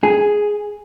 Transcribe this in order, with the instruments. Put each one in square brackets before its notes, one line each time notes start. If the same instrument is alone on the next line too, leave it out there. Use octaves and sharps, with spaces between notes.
[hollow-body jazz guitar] G#4